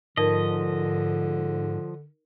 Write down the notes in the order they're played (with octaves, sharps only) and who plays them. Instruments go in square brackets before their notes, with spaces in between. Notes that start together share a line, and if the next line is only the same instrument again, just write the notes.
[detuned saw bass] G#2 [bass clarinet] D3 [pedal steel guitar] F3 D#5 [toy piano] D#4 A#4 D5